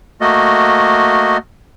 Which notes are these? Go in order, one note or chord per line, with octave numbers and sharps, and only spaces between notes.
A3 A#3 F#4 D#5